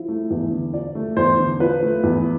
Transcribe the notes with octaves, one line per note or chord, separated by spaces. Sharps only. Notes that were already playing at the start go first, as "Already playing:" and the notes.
Already playing: F3 E4
A3
E2
D3
F3 D5
A3
E2 C5
D3
F3 B4
A3
E2